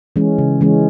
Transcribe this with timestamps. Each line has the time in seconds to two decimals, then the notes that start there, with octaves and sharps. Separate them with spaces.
0.16 E3 G#3 C#4
0.38 C#3
0.61 E3 G#3 C#4